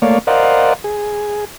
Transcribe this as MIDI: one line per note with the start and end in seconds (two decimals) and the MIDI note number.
0.02 0.19 57
0.02 0.19 58
0.02 0.19 73
0.02 0.19 74
0.02 0.19 77
0.27 0.73 70
0.27 0.73 72
0.27 0.73 74
0.27 0.73 75
0.27 0.73 77
0.27 0.73 78
0.84 1.45 68